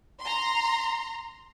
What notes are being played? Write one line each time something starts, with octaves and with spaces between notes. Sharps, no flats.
A#5 C6